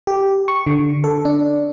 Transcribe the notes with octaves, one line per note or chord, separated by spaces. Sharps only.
G4
C#6
D3
A4
D4